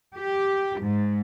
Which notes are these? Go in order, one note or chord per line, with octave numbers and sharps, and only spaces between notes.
G4
G#2